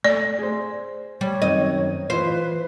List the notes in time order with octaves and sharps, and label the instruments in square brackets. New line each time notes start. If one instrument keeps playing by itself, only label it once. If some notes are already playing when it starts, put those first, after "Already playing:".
[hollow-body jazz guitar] A3 [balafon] D5
[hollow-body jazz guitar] G#4 C5
[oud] G3 [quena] C#5
[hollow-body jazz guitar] F#2 D#3 C4 [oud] D#5
[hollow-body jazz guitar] E3 F4 [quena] B4 [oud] C5